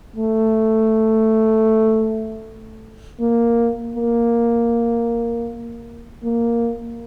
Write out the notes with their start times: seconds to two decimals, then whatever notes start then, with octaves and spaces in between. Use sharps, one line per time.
0.16 A3
3.20 A#3
3.96 A#3
6.24 A#3